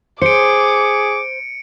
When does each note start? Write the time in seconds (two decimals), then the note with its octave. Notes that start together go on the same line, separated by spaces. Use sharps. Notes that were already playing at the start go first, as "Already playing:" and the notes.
0.22 G#4 C5 D6 C#7 D7